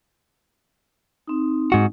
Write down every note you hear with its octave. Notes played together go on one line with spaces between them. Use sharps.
C4 D#4
G#2 F#4